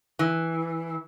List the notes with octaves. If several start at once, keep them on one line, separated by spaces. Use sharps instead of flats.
E3